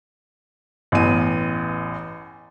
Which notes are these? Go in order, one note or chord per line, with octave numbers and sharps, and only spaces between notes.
A1 E2 D#7